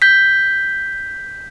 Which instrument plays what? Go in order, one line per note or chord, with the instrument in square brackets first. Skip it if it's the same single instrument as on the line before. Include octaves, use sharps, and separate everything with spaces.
[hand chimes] G6 B6